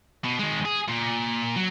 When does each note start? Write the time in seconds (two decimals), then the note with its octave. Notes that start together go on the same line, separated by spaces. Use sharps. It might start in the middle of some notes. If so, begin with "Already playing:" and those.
0.25 B2
0.40 D#3 G#3
0.65 G#4
0.88 A#2
1.56 F#3